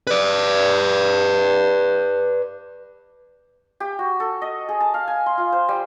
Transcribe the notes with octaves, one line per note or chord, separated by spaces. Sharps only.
B4 D5
G4
F#4
A4
D#5
G#4
A5
F5
G#5
C6
F4
C5
G3